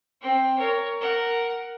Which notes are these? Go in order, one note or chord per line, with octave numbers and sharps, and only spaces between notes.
C4 G5
A#4 C#5
A#4 F#5